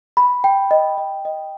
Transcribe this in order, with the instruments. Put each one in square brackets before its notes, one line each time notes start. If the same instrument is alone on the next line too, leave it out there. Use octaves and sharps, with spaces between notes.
[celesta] B5
G5
D#5
D#5
D#5